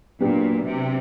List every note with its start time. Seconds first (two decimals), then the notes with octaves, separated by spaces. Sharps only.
0.20 A#2 F#3 B3 D4 G4
0.65 C3